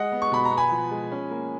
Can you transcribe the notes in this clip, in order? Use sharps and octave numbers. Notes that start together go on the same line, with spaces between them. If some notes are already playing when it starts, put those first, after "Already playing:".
Already playing: G#3 D#5 F#5
B3
C#6
B2 B5
A#5
B3
G#5 B5
F3
G#3
C#4
A#3